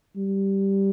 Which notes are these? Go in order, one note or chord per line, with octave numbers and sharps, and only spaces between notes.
G3